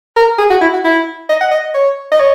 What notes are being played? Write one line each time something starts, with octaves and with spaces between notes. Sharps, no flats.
A#4
G#4
F#4
E4
F#4
E4
D#5
F#5
D#5
C#5
D#5
C#5